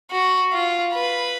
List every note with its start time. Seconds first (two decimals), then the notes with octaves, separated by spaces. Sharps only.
0.11 F#4
0.53 F4
0.94 B4